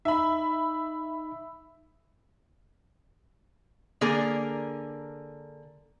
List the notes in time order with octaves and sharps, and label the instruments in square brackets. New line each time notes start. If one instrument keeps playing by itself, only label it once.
[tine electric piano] D#4 [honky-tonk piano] E5 B5
[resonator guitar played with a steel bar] D3 A#3 G#4 A#4